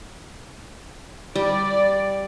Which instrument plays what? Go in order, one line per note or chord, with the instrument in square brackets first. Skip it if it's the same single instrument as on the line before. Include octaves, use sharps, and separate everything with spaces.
[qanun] G3 [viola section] D5